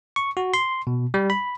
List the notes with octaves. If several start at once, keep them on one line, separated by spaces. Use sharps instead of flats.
C#6
F#4
C6
B2
G3
B5